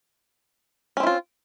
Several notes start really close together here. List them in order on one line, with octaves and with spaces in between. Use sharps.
C#4 C4 E4 F4